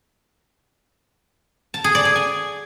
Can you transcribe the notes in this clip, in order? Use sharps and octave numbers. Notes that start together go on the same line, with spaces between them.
A5
G#4
D5
G#4
G#5